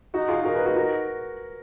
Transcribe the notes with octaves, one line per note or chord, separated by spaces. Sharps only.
D#4 F#4
F4 G#4
D#4 F#4 A#4
G#4 B4
F#4 A#4
F#4 A#4